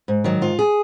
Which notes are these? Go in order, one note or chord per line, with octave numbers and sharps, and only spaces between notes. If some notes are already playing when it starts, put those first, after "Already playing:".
G#2
D#3 F#3
G#2 F4
G#4